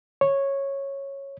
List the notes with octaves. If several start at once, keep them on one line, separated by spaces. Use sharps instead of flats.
C#5